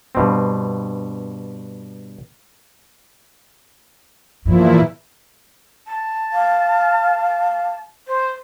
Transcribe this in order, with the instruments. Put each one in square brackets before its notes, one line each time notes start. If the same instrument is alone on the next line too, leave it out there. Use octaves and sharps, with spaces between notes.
[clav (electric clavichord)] G2 B2 C4
[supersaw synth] E2 A#2 E4 [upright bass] G2 [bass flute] F3
[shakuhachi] A5
[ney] F5
[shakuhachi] C5